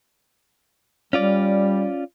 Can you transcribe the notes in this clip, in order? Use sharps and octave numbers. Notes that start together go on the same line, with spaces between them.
G3 C#4 F4 D5